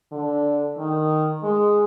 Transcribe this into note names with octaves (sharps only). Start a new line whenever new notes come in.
D3
D#3
G#3